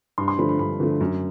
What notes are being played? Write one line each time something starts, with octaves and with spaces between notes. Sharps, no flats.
G2 C6
C6
D3 F3 A3 B5
B5
G2 B5
D3 F3 A3
F#2